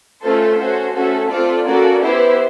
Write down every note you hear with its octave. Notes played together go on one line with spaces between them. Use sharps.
A3 C#4 F4 A4 C5
C#4 F#4 A4
A3 C#4 F#4 A4
A3 C4 F4 A4 D5
A#3 C#4 F#4 A4 D5
B3 E4 G4 C5